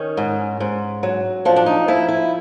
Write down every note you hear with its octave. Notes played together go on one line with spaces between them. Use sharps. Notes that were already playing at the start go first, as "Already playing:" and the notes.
Already playing: D#3 C#4
G#2
G#2
F#3
F3 D4
D4
D#4
F3 E4
E4